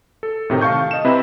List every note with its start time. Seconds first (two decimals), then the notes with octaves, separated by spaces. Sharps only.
0.23 A4
0.50 A2 C3 D#3
0.61 F5 A5 C#6 G6
0.91 D#5 E7
1.04 C3 C4 E4 B4